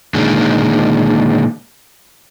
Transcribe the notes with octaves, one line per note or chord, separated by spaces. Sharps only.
A#2 D3 D#3 G#3